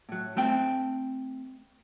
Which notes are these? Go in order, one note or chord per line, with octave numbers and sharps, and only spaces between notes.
A2 F#3
A3 C4 G5